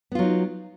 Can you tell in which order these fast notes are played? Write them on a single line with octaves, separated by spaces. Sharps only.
B3 F4 F#3 D#4